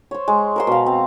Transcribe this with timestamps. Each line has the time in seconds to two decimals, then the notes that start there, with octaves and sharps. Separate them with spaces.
0.11 C5 C#5
0.28 G#3
0.56 A#4 C5 C6
0.67 B2 F5
0.86 C4